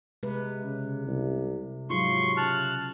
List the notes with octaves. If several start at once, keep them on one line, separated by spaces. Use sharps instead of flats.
C3 G#3 B4
C#3
C2
G#2 F#3 F4 C6 C#6
C#3 A5 F6 F#6